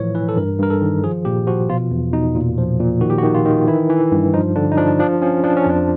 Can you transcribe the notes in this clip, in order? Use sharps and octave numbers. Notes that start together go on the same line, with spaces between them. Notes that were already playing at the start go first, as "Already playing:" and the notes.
Already playing: A2 E3 F3 C#5
E3 B4
A4
G2 A#4
G2 A#4
A4
D#3
F3 G#4
A#2 G4
F3 F#4
B2 F4
E2
B2 D#4
A#2
F3
A#2
D#3 F#4
G4
F#4
D#3
F4
D#3
E3 E4
E3
G2
F3 D#4
D3 D4
D#4
F3 D4
F3 D4
F3 C#4
F3 D4
C#4
F2 D4